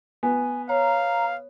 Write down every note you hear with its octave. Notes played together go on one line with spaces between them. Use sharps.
B3 G#5
C#5 F5 A#5